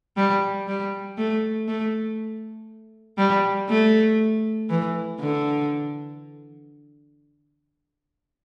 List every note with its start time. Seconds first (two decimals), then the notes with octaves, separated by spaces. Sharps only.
0.17 G3
0.68 G3
1.18 A3
1.68 A3
3.18 G3
3.69 A3
4.70 E3
5.20 D3